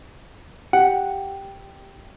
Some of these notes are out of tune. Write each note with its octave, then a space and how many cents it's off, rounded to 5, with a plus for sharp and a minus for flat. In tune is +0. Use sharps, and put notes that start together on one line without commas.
G4 +0 F#5 +0